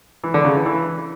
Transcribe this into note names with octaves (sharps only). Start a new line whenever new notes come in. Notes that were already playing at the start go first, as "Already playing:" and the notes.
E3
D3
C#3
E3
E3